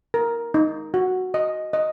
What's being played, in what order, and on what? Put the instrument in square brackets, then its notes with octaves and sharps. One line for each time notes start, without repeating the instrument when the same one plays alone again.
[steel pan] A#4
D#4
F#4
D#5
D#5